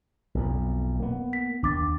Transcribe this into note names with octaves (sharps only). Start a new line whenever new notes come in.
B1 F2
A#3 B3
B6
D#2 D4 D6 A6